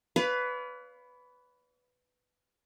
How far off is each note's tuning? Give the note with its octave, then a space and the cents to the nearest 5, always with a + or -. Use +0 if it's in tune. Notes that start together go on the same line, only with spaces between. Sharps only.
B4 +10 D5 -45 F5 +5